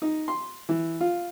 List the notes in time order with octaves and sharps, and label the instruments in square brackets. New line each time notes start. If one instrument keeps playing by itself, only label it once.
[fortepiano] D#4
C6
E3
F4